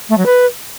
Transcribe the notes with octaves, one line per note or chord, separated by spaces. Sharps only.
A3
F#3
B4